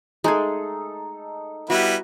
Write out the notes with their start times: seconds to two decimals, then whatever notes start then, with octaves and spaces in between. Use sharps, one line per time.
0.24 G#3 A3 D#4 G#4 A4
1.70 G3 B3 E4 F#4